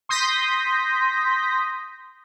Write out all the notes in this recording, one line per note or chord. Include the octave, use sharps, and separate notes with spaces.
C6 D#6 G6 A#6 B6